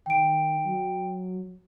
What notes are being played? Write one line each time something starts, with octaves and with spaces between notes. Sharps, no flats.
D#3 G5 D7
F#3